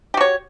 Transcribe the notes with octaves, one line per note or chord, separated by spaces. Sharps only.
F#4 G4 C#5